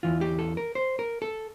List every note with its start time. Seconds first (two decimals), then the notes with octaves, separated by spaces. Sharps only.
0.03 E2 E3 F4
0.21 G4
0.39 A4
0.57 A#4
0.75 C5
0.99 A#4
1.22 A4